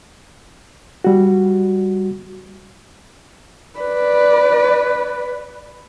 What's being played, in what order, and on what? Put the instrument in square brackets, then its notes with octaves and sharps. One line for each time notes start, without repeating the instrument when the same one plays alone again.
[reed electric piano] G3 F#4
[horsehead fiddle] B4 D5